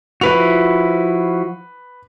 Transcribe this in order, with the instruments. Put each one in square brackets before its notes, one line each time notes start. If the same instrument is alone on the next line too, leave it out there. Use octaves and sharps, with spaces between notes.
[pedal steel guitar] F3 E4 F#4 [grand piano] B4 F7